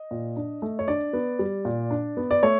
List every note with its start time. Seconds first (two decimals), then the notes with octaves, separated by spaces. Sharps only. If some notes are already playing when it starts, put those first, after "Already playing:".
Already playing: D#5
0.11 A#2
0.37 D4
0.62 A3
0.79 C#5
0.88 D4 D5
1.13 B3
1.39 G3
1.65 A#2
1.91 D4
2.17 B3
2.31 D5
2.43 A3 C#5